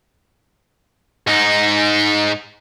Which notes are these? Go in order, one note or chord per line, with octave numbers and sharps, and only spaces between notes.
G#2 D#4